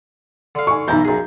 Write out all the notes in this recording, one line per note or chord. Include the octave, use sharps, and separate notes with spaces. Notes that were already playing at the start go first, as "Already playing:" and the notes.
D3 F5
G#5 C#6
B1 E3 B3 E4 A#5 G6
F#2 G#4